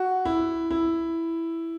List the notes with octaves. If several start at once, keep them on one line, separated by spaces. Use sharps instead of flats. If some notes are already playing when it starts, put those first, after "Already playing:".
Already playing: F#4
E4
E4